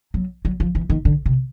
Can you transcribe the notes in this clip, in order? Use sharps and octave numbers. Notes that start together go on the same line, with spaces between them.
F#3
F#3
F3
E3
D#3
D3
C3